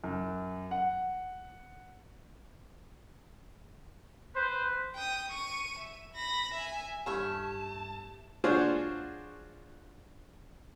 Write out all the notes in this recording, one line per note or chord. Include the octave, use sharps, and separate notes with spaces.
F#2
F#5
B4 C5
G5 D#6
C#6 D#7
E5
B5 A#6
E5 G#5
G2 A3 C4 C#4 E4 G4 A5
D4 F4 F#4 G#4 C5 C#5